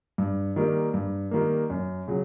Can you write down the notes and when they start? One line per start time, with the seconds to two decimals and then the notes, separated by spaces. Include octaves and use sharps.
0.18 G2
0.56 D#3 G3 A#3
0.94 G2
1.31 D#3 G3 A#3
1.70 F#2
2.08 C#3 F#3